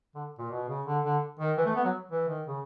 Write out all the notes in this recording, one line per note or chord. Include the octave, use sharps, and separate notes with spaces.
D3
A#2
B2
C#3
D3
D3
D#3
E3
A3
B3
F#3
E3
D#3
C#3